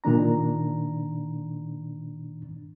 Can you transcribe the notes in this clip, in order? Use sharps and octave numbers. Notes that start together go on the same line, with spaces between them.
A#2 D#3 D4 A#5